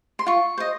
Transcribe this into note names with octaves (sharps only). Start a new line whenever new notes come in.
C6
F4 C#6
C5 D#5